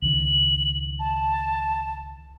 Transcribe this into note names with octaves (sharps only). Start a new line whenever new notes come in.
C#2 D#3 F#7
A5